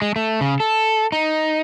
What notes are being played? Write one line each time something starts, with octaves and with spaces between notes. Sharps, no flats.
G#3
A3
C#3
A4
D#4